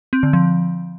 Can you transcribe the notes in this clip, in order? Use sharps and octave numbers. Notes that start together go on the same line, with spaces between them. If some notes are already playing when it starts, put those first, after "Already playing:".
C4
D3
F3